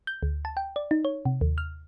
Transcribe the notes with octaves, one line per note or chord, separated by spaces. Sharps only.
G6
D2
A5
G5
D5
D#4
C#5
C3
D#2
F6